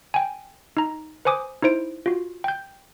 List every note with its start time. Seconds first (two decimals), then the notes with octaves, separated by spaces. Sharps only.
0.14 G5 G#5
0.77 D#4 A#5
1.25 B4 C5 G#5 D6 D#6
1.62 D#4 E4 C5 D7
2.06 F4 F#4
2.44 G5 G6